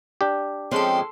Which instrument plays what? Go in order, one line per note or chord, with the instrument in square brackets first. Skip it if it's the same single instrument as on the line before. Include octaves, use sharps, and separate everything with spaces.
[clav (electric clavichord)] D4 G4
[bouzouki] F3 G#3 C#4 [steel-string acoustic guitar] C4 G5 [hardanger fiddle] A4 C6